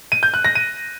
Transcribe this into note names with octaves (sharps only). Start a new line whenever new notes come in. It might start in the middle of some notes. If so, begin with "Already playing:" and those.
D#7
G6
F#6
A#6
D#7